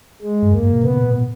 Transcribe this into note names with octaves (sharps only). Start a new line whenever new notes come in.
G#3
G2
E2 A#3
G2
B2
C#3 B3
B2
A#2
A#2